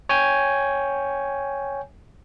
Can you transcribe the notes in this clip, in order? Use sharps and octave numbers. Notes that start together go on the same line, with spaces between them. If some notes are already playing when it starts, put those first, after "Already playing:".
C#5 G5 G#5 G6